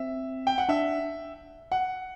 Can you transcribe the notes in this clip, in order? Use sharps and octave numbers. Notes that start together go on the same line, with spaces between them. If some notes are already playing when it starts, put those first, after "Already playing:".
Already playing: C4 E5
G5
F#5
D4 E5
F#5